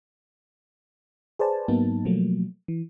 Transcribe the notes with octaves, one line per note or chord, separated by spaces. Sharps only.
G#4 B4 C5 D5 G#5 A5
G#2 F#3 A#3 B3 D#4 A5
B2 F3 F#3 A3 A#3
E3